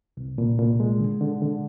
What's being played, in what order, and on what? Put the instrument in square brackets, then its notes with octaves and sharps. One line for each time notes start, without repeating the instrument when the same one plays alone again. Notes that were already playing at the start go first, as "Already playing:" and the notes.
[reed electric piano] C2
A#2
A#2
G#3
D3
D3
D3